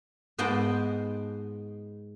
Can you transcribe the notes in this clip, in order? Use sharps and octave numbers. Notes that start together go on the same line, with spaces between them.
G#2 B3 C5 D#5 G5 A5